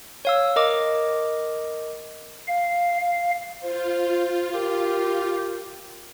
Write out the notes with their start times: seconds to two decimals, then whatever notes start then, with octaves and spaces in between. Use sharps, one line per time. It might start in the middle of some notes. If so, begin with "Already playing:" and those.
0.25 C#5 F5 E6
0.56 A#4 D#5 D6
2.48 F5
3.00 F5
3.62 F4 C5
4.54 G4 A#4